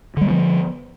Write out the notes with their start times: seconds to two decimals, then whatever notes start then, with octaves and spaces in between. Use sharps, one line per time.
0.17 D3
0.21 G3
0.26 B3
0.31 F3